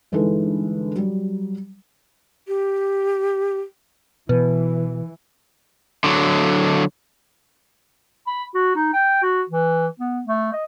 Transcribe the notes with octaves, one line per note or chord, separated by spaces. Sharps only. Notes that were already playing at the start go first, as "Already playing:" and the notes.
G1 E3 G#3 D#4 A4 B4
F#3 G3
G4
B2 E3 B4
D3 F#3
B5
F#4
D#4
G5
F#4
E3
B3
A3
D#5